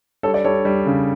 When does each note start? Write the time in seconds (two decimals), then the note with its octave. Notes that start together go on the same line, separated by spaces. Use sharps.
0.23 G3 A4 C#5
0.34 D5
0.45 G3 A4 C#5
0.65 G3
0.86 C#3